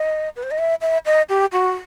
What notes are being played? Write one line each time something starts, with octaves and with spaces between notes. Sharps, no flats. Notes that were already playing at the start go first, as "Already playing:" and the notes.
Already playing: D#5
B4
C5
D#5
E5
E5
D#5
G4
F#4